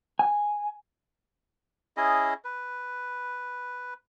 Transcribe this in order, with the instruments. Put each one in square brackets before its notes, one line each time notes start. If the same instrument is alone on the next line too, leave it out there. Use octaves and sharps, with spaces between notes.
[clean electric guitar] G#5
[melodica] C#4 E4 G#4 D#5
B4